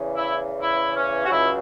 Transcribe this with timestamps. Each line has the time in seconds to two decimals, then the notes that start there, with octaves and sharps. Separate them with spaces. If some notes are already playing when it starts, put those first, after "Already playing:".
Already playing: E2 C#3 E3
0.15 E4
0.61 E4
0.96 C#4
1.26 F#4
1.29 C#2 C#3 F#3 E4